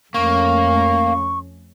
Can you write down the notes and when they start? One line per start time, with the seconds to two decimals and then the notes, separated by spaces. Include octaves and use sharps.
0.14 F2 A3 A#3 C#4 C#6